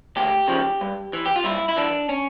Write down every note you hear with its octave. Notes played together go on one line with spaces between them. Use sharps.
D2 G4
C#3 F3
G2
E3
G4
F4
G2 E4
E4
E3 D4
C#4